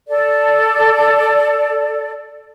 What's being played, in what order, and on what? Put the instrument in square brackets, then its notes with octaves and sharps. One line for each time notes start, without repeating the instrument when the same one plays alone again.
[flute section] A4 D5